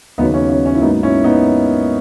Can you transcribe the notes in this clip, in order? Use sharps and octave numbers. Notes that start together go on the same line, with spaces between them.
D#2 C#3 F#3 B3 D#4
C#4
C#4
C#4
E4
G#2 F#3 A#3 B3 D#4
C#4 E4
B3 D#4